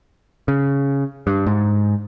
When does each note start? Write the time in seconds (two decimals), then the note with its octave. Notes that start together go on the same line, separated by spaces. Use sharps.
0.48 C#3
1.27 G2
1.47 G#2